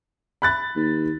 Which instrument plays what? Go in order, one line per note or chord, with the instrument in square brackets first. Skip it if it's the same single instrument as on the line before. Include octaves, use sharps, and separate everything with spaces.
[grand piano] B5 F#6 A6
[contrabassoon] D#2